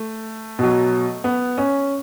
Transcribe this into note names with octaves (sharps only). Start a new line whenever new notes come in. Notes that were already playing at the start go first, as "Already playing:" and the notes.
Already playing: A3
B2 F#3
B3
C#4